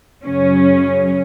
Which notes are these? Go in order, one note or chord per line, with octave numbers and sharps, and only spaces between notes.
F#2 C#3 F#3 C#4